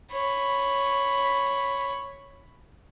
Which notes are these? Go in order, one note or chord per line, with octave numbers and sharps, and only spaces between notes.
C#5 B5